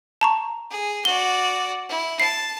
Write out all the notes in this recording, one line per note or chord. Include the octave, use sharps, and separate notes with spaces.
A5 A#5 C#6
G#4
F#4 D5 G7
E4
A5 C7